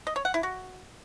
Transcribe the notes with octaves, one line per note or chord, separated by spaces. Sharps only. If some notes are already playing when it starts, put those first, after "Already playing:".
D#5
C#5
F#5
E4
F#4